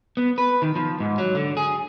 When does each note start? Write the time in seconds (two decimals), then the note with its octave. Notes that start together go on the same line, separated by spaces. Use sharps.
0.17 B3
0.38 B4
0.62 D#3
0.76 F3
1.00 G#2
1.18 F#3
1.35 D3
1.57 G#4